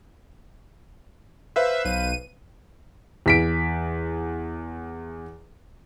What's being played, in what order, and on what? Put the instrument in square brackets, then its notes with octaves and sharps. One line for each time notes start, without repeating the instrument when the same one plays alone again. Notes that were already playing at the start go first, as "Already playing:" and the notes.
[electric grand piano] B4 C5 F5 [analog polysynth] E5
[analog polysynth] B1 D#7
[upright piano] E2 B6 D7